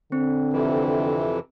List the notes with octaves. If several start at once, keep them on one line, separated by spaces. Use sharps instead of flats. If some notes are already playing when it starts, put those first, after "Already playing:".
D3 C4
F2 C3 E3